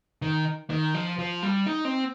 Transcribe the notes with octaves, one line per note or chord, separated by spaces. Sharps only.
D#3
D#3
F3
F3
G3
D#4
C4